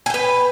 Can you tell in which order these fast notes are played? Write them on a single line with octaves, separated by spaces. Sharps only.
G#5 G5 B4